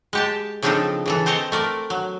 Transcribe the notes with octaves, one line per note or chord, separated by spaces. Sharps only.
G#3 G4 A5
C#3 F3 C4 D4 D#4 A4
C#3 E3 A4
C4 C5 C#5 D#5 A5
A3 A#4 D5
F#3